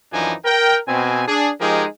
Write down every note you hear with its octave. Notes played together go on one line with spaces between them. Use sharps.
F#2 E3 F3 D4 D#4 G#5
A#4 G5
B2 C4 G#5
D4 G#4
F3 G#3 D#4 G4 G#4 A#4